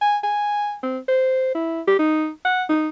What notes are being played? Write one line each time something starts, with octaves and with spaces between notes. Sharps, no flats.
G#5
G#5
C4
C5
E4
G4
D#4
F#5
D#4